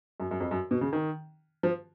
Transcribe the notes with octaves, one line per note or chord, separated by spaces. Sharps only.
F#2
F#2
F2
F#2
B2
C#3
D#3
F3